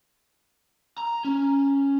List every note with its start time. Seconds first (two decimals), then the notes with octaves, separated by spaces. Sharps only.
0.98 A#5
1.25 C#4